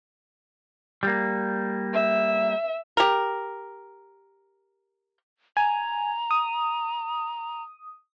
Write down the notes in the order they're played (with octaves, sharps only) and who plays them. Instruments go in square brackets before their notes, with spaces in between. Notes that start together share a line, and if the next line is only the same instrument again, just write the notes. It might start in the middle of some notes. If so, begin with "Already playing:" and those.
[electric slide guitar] G3 A#3
[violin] E5
[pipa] G4 A#4
[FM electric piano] G#5 [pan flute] A#5
[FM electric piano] D#6